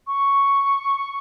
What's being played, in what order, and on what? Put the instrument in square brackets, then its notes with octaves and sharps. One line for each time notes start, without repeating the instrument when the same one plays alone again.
[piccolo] C#6